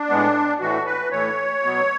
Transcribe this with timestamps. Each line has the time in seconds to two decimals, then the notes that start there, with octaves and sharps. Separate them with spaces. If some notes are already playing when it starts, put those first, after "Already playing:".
Already playing: D4
0.09 A2 G#3 B3
0.60 A2 E3 A3 F#4
0.86 B4
1.11 A2 E3 A3 C#5
1.63 B2 F#3 B3